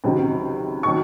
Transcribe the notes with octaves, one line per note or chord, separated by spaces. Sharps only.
C#2 C3 D#3 F#3
D#3 F#3 C#6